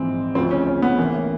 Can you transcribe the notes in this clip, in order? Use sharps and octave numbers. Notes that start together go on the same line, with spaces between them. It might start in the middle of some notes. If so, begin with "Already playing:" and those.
Already playing: A#1 G#2 E3 C4
D2 C#3 F3 C4
C#4
C#4
B3
A1 A2 E3 A#3